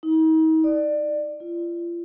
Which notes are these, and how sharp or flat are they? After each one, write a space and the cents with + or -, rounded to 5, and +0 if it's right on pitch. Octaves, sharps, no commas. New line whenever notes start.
D#4 +40
D5 +20
F4 -35